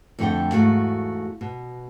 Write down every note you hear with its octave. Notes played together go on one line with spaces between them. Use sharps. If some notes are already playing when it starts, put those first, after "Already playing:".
F2 D3 A3 F#4 F#5 G5
E2 G#2 E3 A3 F#4 F5
B2